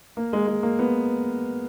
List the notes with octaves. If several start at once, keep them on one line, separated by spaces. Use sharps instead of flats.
A#3
G#3
G#3
A#3
B3